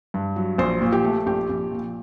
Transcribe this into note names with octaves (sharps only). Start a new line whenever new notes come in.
G2
F#3
A#1 C5
A#2
G4
A3
A#1 G4
A#1
A#2